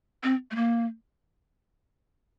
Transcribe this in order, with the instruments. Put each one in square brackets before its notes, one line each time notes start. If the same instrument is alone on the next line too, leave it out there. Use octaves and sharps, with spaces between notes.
[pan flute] C4
A3
A#3